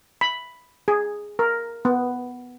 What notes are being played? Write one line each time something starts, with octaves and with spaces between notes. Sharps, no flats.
B5
G#4
A#4
B3